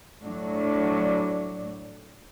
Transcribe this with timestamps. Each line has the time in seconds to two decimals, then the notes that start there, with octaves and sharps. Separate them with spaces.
0.23 A2 F#3 D4